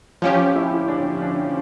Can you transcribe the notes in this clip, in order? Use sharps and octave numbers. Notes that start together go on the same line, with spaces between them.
F3 C#4 F4 G4
E4
D4
D4